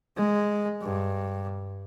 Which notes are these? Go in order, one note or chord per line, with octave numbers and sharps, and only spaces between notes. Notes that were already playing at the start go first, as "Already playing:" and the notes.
G#3
G2